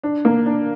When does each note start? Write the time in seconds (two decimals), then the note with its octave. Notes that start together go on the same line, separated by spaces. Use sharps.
0.03 D4
0.25 A#3
0.46 D4